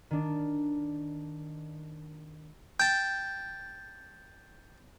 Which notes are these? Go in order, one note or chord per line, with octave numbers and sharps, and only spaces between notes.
D#3 D4
G5 A5 G6